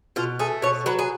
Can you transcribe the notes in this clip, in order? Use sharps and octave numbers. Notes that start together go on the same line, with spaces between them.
B2 F4
A3 G#4
B2 C#5
F#3 B4
G#4